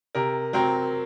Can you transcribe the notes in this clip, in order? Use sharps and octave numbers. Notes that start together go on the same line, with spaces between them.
C3 A#4
F#3 C4 A#4